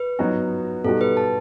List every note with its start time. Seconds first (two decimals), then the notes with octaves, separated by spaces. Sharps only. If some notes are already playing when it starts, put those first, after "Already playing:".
Already playing: B4
0.19 F#3 B3 D#4 F#4
0.84 B2 G3 D#4 F#4 A4
1.01 B4
1.17 A5